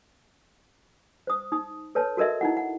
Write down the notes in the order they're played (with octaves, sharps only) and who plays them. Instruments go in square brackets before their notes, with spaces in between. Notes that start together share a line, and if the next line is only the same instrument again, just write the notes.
[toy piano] C5 D#6
D#4 D#6
A4 B4 C#5 A5
F#4 A4 A#4 D#5 E5
D#4 E4 F#5
F#5